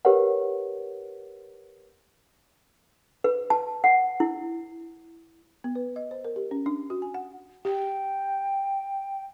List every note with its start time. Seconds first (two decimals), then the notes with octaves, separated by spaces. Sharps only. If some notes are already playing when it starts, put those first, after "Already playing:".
0.05 G4 A#4 B4 C#5 F#5
3.24 B4
3.50 A5
3.84 F#5
4.20 E4
5.64 B3
5.75 B4
5.96 D#5
6.11 C5
6.24 A#4
6.36 G4
6.51 C#4
6.66 D4
6.90 F#4
7.02 G#5
7.14 F#5
7.65 G4 G5